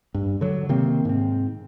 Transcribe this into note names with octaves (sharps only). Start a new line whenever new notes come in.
G2
D3 F#3
C3 D#3 A#3 C4
G#2 C4